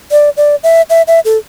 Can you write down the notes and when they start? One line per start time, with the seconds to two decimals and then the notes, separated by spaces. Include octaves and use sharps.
0.11 D5
0.37 D5
0.63 E5
0.90 E5
1.08 E5
1.25 A4